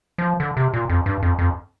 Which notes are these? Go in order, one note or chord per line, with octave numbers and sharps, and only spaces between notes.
F3
D3
C3
A#2
F2
G2
F2
F2